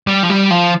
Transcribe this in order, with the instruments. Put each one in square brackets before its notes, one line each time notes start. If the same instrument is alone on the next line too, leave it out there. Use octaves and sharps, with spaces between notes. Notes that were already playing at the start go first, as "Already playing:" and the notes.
[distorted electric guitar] G3
F3
G3
F3